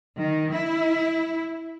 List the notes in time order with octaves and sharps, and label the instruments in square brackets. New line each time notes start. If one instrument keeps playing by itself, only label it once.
[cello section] D#3
E4